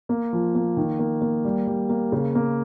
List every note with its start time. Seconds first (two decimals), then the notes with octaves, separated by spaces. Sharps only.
0.09 A#3
0.33 F3
0.55 A#3
0.77 D#3
0.99 A#3
1.22 A#3
1.44 G3
1.67 G3
1.89 A#3
2.12 C#3
2.35 A#3